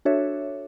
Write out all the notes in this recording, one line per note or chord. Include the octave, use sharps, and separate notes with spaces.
D4 F#4 A4 C#5 E5